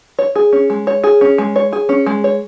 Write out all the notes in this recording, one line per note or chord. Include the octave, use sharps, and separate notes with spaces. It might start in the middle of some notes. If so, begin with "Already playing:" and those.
C#5
G#4
C#4
G#3
C#5
G#4
C#4
G#3
C#5
G#4
C#4
G#3
C#5